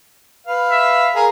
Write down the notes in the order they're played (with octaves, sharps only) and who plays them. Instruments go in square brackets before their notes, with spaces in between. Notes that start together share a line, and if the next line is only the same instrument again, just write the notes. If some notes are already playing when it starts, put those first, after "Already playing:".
[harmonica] B4 F5
[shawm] E5
[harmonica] G#4 A#4 F5